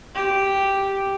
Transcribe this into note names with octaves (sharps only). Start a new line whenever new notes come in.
G4